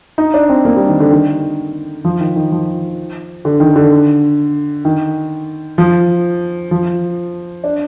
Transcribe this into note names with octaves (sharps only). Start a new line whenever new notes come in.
D#4
D4
C4
A#3
G3
D#3
D3
D#3
F3
D#3
D#3
F3
D3
D#3
D3
D#3
F3
F3
D4